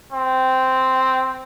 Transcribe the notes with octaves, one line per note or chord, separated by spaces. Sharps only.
C4